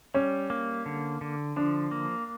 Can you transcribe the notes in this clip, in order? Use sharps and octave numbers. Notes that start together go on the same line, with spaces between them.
G3 C#4
A#3
D3
D3
F3 D4
A#3